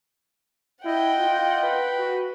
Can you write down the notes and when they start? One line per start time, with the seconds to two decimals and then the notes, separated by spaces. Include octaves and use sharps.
0.85 E4 D#5 F#5 G5
1.19 F4
1.63 B4
1.99 F#4